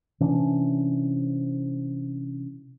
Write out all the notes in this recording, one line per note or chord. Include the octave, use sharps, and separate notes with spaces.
C3 E3 C#4 D4